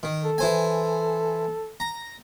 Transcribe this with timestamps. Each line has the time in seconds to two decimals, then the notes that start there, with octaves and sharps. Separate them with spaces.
0.03 D#3
0.25 A4
0.38 E3 C5 G#5
1.80 A#5